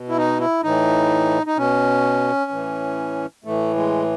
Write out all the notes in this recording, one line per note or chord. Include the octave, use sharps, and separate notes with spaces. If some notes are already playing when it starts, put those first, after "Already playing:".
Already playing: B2
E4
D#4
E4
A2 E3 D#4
D#4
B2 C#4
A2 E3
A2 E3 A3
G#3